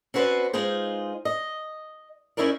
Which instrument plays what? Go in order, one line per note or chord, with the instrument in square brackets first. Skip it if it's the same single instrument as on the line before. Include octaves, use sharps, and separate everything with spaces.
[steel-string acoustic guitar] C4 C#4 F#4 B4 C5 D5
G#3 D#4 F4 G#4 C5
D#5
C#4 D#4 E4 G#4 A#4 D5